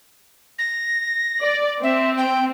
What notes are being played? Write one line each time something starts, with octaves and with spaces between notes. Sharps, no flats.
A#6
D5
C4 E5
G5